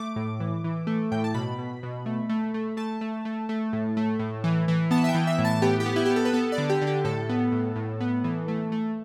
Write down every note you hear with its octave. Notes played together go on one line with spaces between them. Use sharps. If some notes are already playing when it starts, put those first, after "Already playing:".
Already playing: A3 D6
A2
E3
E3
A3
A2 G5
A5
B2 B5
B2
B2
A3
A3
A3
A3 A5
A3
A3
A3
A2
A3
A2
E3
E3
B3 A5
E5
G5
E3
E5
A2
A5
B3 G4
G4
B3
E4
B3 G4
A4
B4
B3 A4
D5
D3
G4
D3
G4
A2 A4
B3
A2
A2
B3
E3
A3
A3